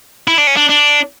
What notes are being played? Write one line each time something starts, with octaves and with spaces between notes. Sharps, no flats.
E4
D4
C#4
D4
D4